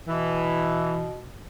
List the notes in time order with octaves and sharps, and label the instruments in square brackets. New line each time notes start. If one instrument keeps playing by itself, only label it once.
[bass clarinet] B2 [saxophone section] E3